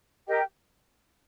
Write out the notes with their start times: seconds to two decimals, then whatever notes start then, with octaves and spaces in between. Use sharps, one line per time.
0.27 G4 A#4 D#5 G5